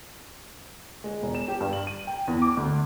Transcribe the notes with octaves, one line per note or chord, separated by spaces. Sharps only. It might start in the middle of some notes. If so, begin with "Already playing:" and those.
G#3
E1
E7
G4
G2
F#7
D#7
G5
E2
D6
D2